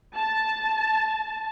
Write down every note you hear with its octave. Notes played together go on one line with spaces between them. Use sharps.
A5